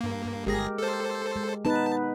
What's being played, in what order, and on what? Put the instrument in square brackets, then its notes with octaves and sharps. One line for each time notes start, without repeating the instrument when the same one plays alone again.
[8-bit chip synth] G2 A#3
[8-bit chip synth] G1 G#4 A#6 [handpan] G#3 G4 A#4
[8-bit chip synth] A4 C5
[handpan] G#3
[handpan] B3 D#4 B4 [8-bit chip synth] A5